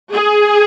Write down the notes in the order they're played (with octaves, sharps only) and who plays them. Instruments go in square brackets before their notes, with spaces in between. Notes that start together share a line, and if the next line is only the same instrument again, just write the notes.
[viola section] G#4